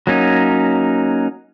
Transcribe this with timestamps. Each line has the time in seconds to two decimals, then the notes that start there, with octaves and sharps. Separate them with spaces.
0.07 F#3 A#3 C#4 D#4